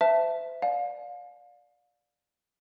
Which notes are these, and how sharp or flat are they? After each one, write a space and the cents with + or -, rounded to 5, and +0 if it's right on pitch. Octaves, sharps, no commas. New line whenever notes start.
C5 -40 E5 +10 A5 +0
D5 +0 F5 +30 G#5 +35